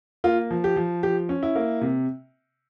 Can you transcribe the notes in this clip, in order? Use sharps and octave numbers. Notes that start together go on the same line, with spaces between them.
A#3 F4
F3
G4
F3
F3 G4
C#4
E4
A#3
C3